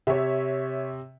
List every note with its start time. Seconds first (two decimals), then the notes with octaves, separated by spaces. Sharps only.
0.07 C3 C#5 E5